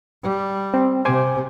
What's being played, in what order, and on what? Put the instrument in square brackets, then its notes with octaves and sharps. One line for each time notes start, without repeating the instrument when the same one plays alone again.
[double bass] G3
[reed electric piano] C4
[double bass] C3 [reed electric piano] C5 G#5 D6